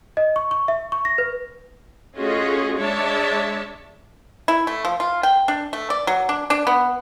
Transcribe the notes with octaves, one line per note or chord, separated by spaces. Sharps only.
D#5
C#6
C#6
E5
C#6
A#6
B4
A3 C#4 F4 F#4 G#4 D#5
G#3 D4 C#5 D5 E5 A5
E4
A3
F3
F4
G5
D4
A3
D5
F#3
D4
D4
B3